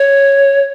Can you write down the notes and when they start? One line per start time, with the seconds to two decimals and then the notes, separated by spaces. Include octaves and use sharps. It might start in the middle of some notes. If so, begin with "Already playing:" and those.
Already playing: C#5